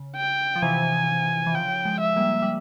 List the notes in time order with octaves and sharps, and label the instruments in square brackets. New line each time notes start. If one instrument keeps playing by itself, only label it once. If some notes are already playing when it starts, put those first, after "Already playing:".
Already playing: [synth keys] C#3
[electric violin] G5
[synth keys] F3
[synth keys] C3 E3 [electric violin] G#5
[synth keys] E3
[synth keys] C#3 F3 [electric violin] G5
[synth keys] F3 G#3
[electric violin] E5
[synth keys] G3 A#3
G3